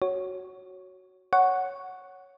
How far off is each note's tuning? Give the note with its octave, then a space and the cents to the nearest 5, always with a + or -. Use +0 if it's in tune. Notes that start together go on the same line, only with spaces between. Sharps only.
F#4 +5 C#5 +0
C#5 +0 F#5 +0 C#6 +0